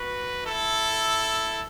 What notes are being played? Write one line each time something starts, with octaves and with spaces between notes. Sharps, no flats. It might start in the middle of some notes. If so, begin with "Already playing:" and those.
Already playing: F#4 B4
E4 A4